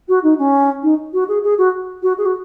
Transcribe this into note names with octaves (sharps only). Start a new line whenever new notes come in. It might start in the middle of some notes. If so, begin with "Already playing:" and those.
F#4
D#4
C#4
D#4
F#4
G#4
G#4
F#4
F#4
G#4
F#4